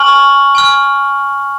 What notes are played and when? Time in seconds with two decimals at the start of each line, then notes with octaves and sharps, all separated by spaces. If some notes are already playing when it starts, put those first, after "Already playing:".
Already playing: G#5 C#6 F6 F#7
0.55 G#5 C#6 F6